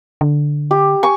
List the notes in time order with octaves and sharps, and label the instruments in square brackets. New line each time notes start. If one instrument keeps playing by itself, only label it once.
[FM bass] D3
[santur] G4
G#5 C#6